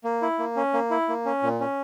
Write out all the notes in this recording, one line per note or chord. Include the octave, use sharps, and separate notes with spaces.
A#3
E4
A#3
C#4
A#3
E4
A#3
C#4
A#2
C#4